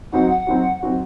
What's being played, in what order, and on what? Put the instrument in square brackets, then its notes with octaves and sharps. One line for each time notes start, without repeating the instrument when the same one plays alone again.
[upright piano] F#3 C4 D#4 F#4 [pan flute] F#5
[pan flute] F#5
[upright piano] F#3 C4 D#4 F#4
F#3 C4 D#4 F#4